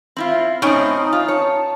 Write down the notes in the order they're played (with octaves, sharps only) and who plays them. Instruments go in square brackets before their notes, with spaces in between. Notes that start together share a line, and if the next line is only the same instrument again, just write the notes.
[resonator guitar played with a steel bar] C4 E4 F4
[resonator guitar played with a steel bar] A2 C4 [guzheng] C#4 G5 [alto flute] D#4
[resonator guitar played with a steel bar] F4
[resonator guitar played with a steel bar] C#5 [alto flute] A5